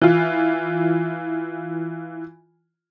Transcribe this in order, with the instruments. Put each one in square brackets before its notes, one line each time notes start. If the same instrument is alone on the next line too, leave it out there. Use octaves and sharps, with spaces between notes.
[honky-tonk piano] E3 F4